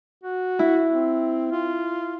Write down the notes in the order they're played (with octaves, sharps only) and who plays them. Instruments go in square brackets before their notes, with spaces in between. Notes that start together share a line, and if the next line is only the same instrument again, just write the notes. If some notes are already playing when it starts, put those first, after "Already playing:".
[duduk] F#4
[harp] E4
[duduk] C4
F4